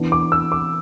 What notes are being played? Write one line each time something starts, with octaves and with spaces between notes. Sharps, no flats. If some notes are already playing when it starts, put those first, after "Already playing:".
Already playing: E3 B3 D4
D6
E6
D6